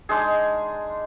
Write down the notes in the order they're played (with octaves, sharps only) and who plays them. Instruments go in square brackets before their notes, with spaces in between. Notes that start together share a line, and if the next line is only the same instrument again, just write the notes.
[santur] G#3 D4 D#4 G#4